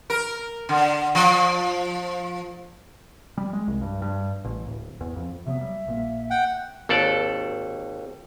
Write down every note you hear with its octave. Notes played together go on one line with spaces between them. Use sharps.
A#4
D3
F3
G3
G#3
C2
G2
G2
A1
D1
E2
F2
C3 F#3 B3 E5
G3
A#1 A#2 A#3
F#5 G5
G#1 D#2 A4 D5